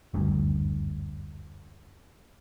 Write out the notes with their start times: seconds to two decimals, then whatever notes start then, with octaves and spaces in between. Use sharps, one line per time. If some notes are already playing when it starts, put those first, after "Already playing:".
0.14 F#1 D2 G2